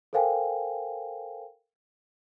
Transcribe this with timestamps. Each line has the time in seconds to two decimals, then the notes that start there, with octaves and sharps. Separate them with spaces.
0.13 A4 A#4 C5 F5 G5 G#5